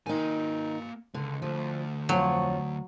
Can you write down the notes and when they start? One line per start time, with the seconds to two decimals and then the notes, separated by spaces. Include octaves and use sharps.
0.06 D#3 A#3 D#4 G#5
1.14 C#2 D3
1.42 D2 F3
2.09 F2 F3 F#3 C#5